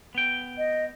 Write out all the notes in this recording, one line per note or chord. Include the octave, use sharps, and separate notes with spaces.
B3 G5
D#5